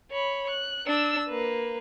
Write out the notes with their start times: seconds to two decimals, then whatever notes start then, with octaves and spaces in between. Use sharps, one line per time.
0.11 C#5 B5
0.50 F#6
0.86 D4 E6
1.28 A#3 B4